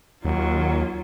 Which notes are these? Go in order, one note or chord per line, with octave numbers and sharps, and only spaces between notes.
D#2 F#3 F4